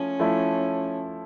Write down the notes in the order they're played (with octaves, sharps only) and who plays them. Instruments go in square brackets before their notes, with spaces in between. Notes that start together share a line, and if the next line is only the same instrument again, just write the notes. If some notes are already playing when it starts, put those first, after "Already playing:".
Already playing: [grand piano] F3 A3 E4 [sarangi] C#4
[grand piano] F3 A3 E4